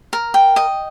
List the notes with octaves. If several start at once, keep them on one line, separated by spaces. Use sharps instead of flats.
A#4
G5
D#5